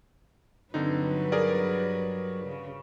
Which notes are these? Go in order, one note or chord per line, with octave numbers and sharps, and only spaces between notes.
G2 D3 F#3 C4 D#4 B4
G#4 A#4 D5
C#3